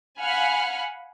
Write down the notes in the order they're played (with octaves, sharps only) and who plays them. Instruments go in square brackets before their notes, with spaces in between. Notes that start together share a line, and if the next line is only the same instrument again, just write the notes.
[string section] F5 F#5 G#5 B5 F6